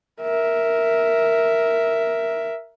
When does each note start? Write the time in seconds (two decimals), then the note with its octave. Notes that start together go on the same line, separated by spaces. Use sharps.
0.21 A#4 E5